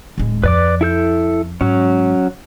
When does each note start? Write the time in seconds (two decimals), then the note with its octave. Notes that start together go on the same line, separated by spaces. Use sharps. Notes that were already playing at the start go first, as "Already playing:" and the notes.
0.18 D1 G#3
0.44 F2 B4 D5 D6
0.81 E4 A4 G6
1.61 G#2 F#3 C#4